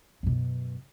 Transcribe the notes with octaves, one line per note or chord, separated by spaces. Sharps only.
F#2 B2